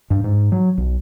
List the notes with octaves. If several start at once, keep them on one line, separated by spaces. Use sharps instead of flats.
G2
G#2
F#3
B1